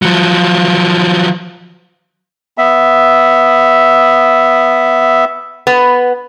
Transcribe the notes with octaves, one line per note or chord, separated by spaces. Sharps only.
F3 F#3
B3 E5
B3